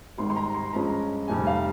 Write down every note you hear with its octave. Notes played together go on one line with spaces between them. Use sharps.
G#1 G#2 G3 C6
C6
A#5
C6
G2 F3 G#3 C#4 A#5
F1 F2 C3 G3 G#5
F5